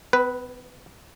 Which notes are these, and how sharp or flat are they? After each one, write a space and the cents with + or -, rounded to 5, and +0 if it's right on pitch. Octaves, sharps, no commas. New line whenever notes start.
B3 +45 B4 +0